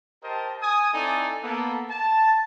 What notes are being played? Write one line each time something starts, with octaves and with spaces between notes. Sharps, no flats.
G4 A#4 C5 D#5 A5
G#5 D#6
C4 D#4 E4 A4 D5 G#5
A#3 B3 A4
A5